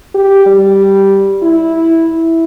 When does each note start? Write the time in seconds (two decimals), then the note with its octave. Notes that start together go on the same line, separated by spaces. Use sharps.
0.15 G4
0.46 G3
1.43 E4